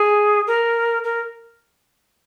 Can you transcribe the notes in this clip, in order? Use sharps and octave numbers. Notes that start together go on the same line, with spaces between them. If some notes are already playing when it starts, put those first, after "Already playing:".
Already playing: G#4
A#4
A#4